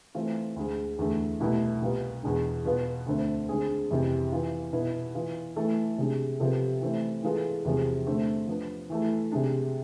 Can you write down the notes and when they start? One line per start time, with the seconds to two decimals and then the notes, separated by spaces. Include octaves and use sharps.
0.15 E3 A3 C4 F4
0.56 D2 D3 G#3
0.99 E2 D3 A3
1.40 C2 B2 A3 E4
1.82 C2 B2 B3 F4 B4
2.23 E2 B2 G#3 D4
2.65 B2 B3 F4 B4
3.06 D2 D3 A3 C4
3.49 D3 G#3 C4 G#4
3.91 F2 C3 E3
4.32 E3 B3 F4
4.73 B2 B3 E4 B4
5.15 E3 B3 F4
5.56 E3 A3 E4 A4
5.98 C3 G#3 D4
6.40 C3 F3 B3 F4 A4
6.81 E3 A3 C4 E4
7.23 E3 G#3 B3 F4 A4
7.65 E2 C3 F3 G#3
8.07 D3 A3 C4
8.48 F3 B3 D4
8.90 E3 A3 E4 A4
9.32 C3 G#3 D4